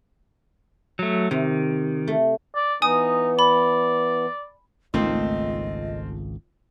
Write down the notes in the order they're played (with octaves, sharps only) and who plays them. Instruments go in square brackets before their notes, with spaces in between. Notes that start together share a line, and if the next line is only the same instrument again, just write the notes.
[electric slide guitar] F#3 A3
[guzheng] C3 [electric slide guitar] D#3
[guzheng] A3
[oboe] D5
[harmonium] E3 B3 [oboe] D#4 [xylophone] G#5 D#6
[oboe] D5 [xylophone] B5
[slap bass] G#1 C#2 [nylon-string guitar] A3 A#3 D#4 [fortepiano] C4 F4 [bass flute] D#5